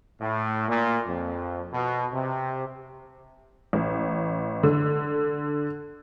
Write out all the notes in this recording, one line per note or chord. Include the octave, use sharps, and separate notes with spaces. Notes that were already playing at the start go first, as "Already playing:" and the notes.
A2
A#2
F2
B2
C3
A1
D3